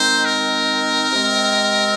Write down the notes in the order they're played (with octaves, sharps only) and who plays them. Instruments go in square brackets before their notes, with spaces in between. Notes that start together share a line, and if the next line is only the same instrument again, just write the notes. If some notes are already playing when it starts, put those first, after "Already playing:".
Already playing: [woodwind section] D#3 G#3 C4 D#4 [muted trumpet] C5
[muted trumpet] A#4
[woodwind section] C3 G#3 C4